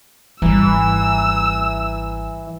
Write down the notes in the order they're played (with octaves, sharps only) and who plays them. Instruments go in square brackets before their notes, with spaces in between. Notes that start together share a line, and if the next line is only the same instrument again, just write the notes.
[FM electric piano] G#1 A#5 [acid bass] E3 [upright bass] G3 B3 [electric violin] E6